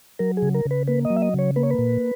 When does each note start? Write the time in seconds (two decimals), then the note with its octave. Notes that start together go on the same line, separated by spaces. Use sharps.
0.19 F#3 A#4
0.37 G#4
0.42 C#3
0.54 A#4
0.65 C#3
0.71 B4
0.87 A#3 B4
1.05 D#5
1.10 F#3
1.16 E5
1.22 D#5
1.34 C#3 C#5
1.56 A#3 B4
1.63 C#5
1.70 B4
1.79 A#2